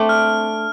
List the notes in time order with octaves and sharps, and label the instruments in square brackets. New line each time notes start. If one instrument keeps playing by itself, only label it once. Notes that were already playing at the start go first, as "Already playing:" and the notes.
Already playing: [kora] A3 C4 D4
[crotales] F6